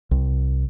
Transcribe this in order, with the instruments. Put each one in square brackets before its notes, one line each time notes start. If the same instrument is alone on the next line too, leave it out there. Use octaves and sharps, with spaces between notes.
[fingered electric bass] C2